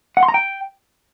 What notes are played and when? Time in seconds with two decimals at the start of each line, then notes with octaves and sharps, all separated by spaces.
0.17 F#5
0.23 C6
0.28 A#5
0.34 G5